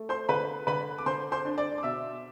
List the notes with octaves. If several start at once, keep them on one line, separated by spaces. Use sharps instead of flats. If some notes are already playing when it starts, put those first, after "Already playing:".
Already playing: A3
C5 C6
D3 B4 B5
D3 B4 B5
D6
D3 C5 C6
C5 C6
D4
D5 D6
D6
B2 E5 E6